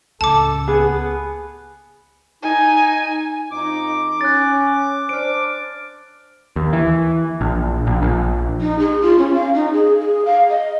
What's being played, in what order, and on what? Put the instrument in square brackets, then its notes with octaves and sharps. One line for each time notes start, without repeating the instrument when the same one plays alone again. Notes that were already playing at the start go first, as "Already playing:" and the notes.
[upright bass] C#2 A2 [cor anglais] A4 [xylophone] A5 D6
[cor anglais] B3 [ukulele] G#4
[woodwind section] D#4 [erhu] G#5
[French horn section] F2 D#4 [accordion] D6
[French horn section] C#4 [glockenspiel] F#6 A6
[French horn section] D4 C5 [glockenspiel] F6 D7
[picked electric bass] D#2
E3
A#1
A#1
A#1
[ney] D#4
G#4
F4
C#4
F5
D#4
G#4
G#4
F5
D#5